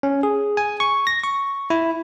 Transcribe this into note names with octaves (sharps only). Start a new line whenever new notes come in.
C#4
G#4
G#5
C#6
A#6
C#6
E4